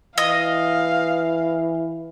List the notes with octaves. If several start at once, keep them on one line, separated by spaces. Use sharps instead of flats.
E3 D#5 F5